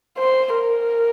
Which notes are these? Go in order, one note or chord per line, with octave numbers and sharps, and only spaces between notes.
C5
A#4